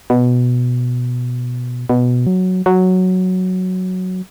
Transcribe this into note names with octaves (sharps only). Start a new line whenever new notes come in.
B2
B2
F#3
F#3